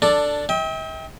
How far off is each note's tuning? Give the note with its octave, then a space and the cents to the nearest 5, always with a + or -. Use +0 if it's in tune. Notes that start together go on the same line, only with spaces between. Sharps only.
D4 +0 A4 +15 D5 +0
E5 -45 G5 +15